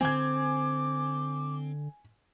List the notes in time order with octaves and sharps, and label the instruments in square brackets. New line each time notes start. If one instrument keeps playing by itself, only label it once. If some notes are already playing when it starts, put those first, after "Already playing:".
[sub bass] D3 [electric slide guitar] C4 [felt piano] G#5 G#6 [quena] D6